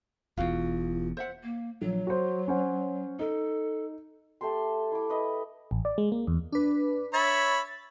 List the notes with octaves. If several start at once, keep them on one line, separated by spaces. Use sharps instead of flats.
E1 E2 F4 F#4 F5
C5 E5 F#5
A#3
A#1 F#3
F#4 C5
C#4 C5 F#5
D#4 A4
A3 G4 A4 C6
E4 D6
B4 D#5
A1
D5
G#3
A#3
E2
D4 B4
C#5 E5 B5 A6